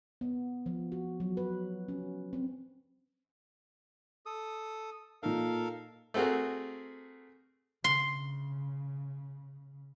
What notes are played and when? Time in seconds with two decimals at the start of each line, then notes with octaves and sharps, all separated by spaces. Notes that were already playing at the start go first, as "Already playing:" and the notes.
0.21 B3
0.66 F3
0.92 F#4
1.20 F#3
1.37 B4
1.88 C#4
2.33 C4
4.26 A4 D#6
5.23 A#2 D#4 A4 A#4 F5
6.14 A3 C4 F#4 G#4 A#4
7.84 C#3 C6